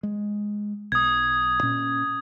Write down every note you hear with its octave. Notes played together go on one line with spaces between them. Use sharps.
G#3
B1 D#6 G#6
A#2 C#4